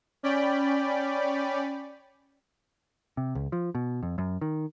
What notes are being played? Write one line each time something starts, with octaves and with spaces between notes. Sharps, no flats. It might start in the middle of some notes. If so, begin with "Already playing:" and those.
C#4 D5 G5 B5
C3
C#2
F3
B2
F2
F#2
D#3